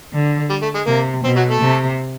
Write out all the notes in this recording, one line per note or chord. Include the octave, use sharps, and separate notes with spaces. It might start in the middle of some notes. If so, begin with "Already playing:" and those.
D3
G3
A3
G#3
C3 A#3
B2 C4
F#3 F#4
A3 A4
C3